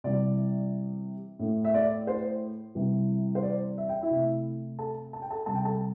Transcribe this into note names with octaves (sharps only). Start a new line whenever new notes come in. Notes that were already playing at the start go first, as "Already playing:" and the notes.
C3 E3 G3 D5
A2 A3
E5
D5
C5
C3 E3 G3
C5
D5
E5
G5
E4 E5
C3
A3
A4 A5
A5
G5
A4 A5
C3 G3 A5
G5
A4 A5